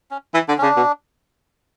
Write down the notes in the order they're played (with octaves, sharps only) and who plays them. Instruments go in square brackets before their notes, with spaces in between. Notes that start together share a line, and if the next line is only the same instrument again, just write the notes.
[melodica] C#4
[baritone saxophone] E3
[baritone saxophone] D3 [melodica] D4
[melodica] C#4
[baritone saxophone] C#3 [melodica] D4
[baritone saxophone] B2